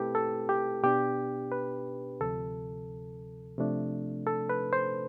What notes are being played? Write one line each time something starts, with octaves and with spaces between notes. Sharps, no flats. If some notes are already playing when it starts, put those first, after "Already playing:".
Already playing: B2 A3 C4 E4 G4 A4 B4
A4
G4
B2 B3 D4 G4
B4
D2 C3 F3 A4
C3 F3 A3 D4
A4
B4
C5